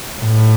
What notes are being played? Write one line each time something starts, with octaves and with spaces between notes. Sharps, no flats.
A2